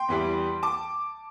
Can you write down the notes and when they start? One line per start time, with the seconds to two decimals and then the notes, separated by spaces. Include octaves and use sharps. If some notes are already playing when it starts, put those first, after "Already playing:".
Already playing: G5 C6
0.08 E2 E3 G3
0.63 A5 D6